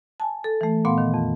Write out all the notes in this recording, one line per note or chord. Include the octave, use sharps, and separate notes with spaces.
G#5 A5
A4
E3 A3
A#2 B3 F5 F#5 C6
D#3
F2